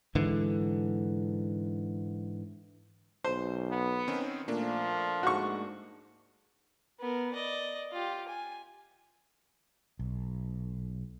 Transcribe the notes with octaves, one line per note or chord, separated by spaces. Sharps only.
G#2 D3 E3
B1 C5
B3
D#3 C4 C#4
A#2 F3 A3 A#3 D4
G#2 F#4 C#6
B3 A#4
D5 D#5
F4 G4
G#5
B1